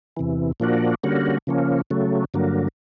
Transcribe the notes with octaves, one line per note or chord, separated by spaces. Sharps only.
E2 C3 E3
A#2 F3 A#3 D4 F#4
D3 G3 A#3 C#4 F#4
C#3 F3 A#3 C#4
C#3 F#3 A3
G2 D3 F#3 A#3